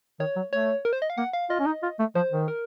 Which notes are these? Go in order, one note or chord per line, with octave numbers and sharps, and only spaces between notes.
D#3 C#5
F#3
A3 C#5
A#4
C5
D#5
F5
A#3 F#5
F5
F4 D#5
C#4
D#4
F4
A3
F3 C5
D#3
A#4